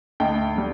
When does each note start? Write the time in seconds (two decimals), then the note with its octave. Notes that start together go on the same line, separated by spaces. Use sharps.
0.20 D2 D#5 G5
0.55 D3 G3